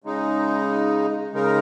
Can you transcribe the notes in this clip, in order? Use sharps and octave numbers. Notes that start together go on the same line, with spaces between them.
C#3 G#3 D#4
C#3 G#3 D#4 A#4